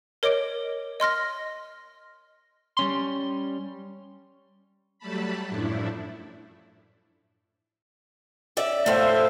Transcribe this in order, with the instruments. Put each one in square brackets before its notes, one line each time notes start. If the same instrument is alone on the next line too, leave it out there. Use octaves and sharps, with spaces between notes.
[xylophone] A#4 C#5 D#5 D6 D7
D#5 C6 F6 A#6
[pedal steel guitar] G3 C#4 C6
[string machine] F#3 G3 A3 A5 B5
F#2 A2 F3 A3 D4 E4
[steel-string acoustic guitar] C#4 D5 E5
[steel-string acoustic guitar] A2 A3 [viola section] C5 E5 F5